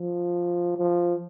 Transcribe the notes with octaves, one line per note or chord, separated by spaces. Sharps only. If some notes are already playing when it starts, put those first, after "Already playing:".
Already playing: F3
F3